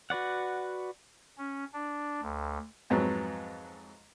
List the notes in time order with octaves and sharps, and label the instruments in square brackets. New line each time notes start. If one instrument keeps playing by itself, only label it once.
[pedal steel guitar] F#4 B4 D5 F#5
[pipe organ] C#4
D4
D2
[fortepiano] F2 G#2 F#3 B3